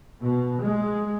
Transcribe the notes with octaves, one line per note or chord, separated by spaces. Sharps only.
B2
G#3